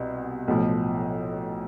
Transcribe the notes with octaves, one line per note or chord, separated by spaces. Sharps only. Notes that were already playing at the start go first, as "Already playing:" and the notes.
Already playing: C2 B2
B1 A2 F3